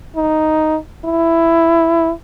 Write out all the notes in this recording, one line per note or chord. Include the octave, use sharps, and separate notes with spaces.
D#4
E4